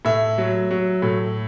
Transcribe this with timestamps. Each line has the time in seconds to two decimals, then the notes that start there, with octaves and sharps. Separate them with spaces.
0.05 A2 E5
0.38 F#3
0.71 F#3
1.02 A2